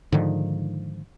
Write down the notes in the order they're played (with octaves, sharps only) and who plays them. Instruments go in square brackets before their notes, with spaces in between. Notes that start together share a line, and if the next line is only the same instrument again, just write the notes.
[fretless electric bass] G#2 D3 D#3 F3